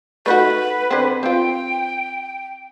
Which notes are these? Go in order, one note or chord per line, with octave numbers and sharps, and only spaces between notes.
A3 D#4 F#4 B4
D3 C4
C4 F4 G5